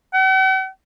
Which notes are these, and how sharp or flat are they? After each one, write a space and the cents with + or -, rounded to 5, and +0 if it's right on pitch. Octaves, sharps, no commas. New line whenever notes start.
F#5 +45